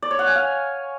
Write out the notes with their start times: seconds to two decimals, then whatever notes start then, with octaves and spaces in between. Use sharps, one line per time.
0.02 D5
0.11 C#5
0.19 F#5
0.27 G#5
0.35 F5